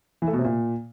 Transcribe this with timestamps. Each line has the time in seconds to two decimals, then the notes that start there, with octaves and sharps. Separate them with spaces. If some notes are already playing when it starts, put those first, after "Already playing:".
0.22 E3
0.28 A3
0.33 B2
0.39 C3
0.45 A#2